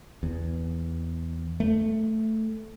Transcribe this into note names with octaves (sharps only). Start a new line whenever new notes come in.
E2
A3